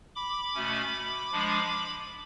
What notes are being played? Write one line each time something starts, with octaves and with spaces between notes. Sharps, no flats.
B5 D6
B2 A3 C#4
F3 G#3 D4